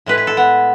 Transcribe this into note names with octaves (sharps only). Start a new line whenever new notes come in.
A2 G#3 B4
B4
A4
B3